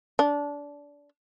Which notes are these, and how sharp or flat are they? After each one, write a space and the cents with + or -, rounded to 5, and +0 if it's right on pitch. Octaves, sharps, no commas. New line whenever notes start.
D4 -20